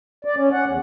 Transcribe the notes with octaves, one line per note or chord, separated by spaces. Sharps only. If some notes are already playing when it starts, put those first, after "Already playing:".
D5
C#4
F#5
E2